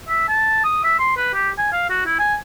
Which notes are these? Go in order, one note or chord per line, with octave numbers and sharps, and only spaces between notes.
E5
A5
D#6
E5
C6
B4
G4
G#5
F5
F#4
E4
G#5